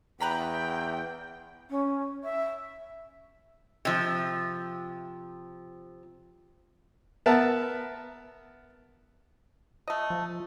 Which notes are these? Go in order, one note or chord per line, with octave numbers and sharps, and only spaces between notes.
E2 B4 G5 A#5 B5
C#4
E5
C3 F3
B3 A#4 E5 A5
A3 D#5
F3